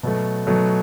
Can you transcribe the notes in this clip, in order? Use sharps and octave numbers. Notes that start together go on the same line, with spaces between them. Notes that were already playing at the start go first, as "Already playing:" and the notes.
B2 F#3 A3
B2 F#3 A3